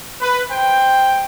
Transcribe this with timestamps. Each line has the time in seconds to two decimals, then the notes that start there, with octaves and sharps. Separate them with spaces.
0.21 B4
0.51 C5 G5